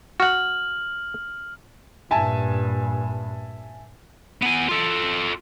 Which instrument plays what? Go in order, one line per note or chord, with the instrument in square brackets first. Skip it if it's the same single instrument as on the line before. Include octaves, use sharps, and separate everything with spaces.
[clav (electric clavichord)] F#4 F#5 [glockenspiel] F6 F#7
[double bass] G2 A#2 [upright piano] E5 G#5 A5
[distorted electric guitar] B3 G#5
F4 A4